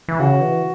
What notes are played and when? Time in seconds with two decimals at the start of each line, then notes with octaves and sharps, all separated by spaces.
0.08 E3
0.19 C#3 F#4
0.41 E3